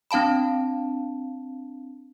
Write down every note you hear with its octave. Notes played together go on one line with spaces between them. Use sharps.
C4 D4 F5 A5 B5